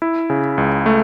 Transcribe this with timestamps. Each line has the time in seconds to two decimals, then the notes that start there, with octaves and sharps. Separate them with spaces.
0.02 E4
0.30 C#3
0.58 C#2
0.86 A3